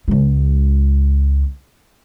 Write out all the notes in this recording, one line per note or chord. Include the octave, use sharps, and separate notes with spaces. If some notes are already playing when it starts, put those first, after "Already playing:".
C#2 G#3